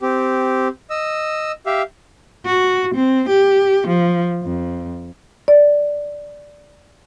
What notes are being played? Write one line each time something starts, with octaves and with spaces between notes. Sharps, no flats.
C4 G4
D#5 E6
G4 E5 F5
F#4
C4
G4
F3
F2
D5